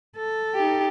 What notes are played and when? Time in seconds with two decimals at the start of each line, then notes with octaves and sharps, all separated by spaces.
0.16 A4
0.55 D#4 G4